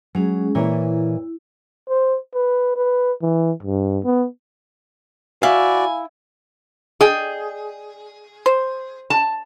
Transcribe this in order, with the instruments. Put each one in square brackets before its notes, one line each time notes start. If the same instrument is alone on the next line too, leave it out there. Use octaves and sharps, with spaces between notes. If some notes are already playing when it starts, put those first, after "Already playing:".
[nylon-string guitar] F#3 [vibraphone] G#3 C#4 G#4
[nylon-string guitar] A#2 E3 C#5 [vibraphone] E4
[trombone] C5
B4
B4
E3
G2
B3
[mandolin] E4 [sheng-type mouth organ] F#4 D5 [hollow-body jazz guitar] F5 [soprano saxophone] G#5
[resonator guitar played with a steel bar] G#4 [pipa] D5 D#5 G5
[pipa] C5
[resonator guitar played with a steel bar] A5